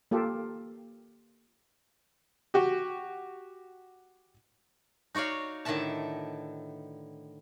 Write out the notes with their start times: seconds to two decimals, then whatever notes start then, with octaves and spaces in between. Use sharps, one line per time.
0.11 A#3 F4 G4 A4
2.54 F#4 G4
5.15 D#4 F#4 C#5 D5 F5
5.65 A2 D3 D#3 B4 E5 A5